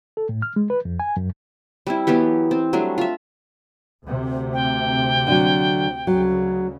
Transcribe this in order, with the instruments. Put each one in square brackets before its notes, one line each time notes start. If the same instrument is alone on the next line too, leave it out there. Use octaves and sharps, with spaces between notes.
[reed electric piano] A4
A2
F6
G#3
B4
F2
G#5
F#2
[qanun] G3 C4 E4
E3 F#3 B3 G4
C4
F#3 G3 A3 D4
F4 E5
[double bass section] D2 C3
[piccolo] G5
[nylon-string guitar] D3 F#3
[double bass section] D2 C#3 [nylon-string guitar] F#3